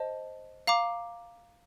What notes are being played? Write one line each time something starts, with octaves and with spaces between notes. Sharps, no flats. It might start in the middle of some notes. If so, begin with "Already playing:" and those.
Already playing: C5 D#5 A5
F5 A#5 D6